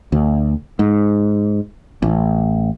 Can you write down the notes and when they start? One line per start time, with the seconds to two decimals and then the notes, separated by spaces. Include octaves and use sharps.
0.12 D2
0.79 G#2
2.02 A1